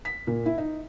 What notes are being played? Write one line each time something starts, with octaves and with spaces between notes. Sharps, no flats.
B6
A#2
E4
D#4